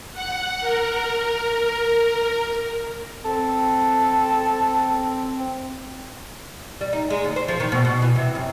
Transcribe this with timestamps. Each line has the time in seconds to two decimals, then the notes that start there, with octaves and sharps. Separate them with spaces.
0.14 F#5
0.61 A#4
3.25 C4 A4
6.81 G3
6.93 D#4
7.10 G#3
7.24 D#2
7.36 C5
7.48 F3
7.60 D#3
7.72 B2
7.85 B2
8.02 E3
8.16 C3
8.35 F#2